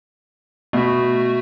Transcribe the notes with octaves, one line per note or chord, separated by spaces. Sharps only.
B2 A3 F#4